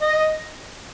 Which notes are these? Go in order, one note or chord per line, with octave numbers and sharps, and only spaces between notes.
D#5